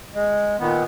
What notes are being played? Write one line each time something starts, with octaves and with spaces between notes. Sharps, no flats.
G#3
A#2 D#3 B3